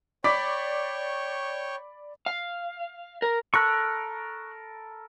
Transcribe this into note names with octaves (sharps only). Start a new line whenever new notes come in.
C#5 D5 G5 B5 C#6 D6 B6
F5
A#4
A4 A#4 B5 C#6 F#6